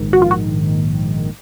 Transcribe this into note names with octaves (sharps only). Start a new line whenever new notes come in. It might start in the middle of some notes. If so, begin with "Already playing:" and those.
Already playing: A#1 G#2 D#3
F#4
F4
F#4